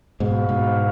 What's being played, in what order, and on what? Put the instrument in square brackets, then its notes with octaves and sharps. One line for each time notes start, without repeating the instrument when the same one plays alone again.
[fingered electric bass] G#2 B2 [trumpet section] F#4 B4 F5
[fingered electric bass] G#2 B2